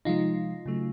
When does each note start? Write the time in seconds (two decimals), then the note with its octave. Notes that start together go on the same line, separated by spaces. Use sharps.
0.05 C3 F3 G#3 D#4 F4
0.66 C#3 F#3 A3